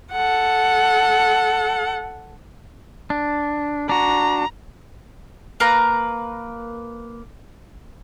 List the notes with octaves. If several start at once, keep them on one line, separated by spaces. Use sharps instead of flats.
A4 F#5
D4
D4 F#4 A#5
A#3 B4 A#5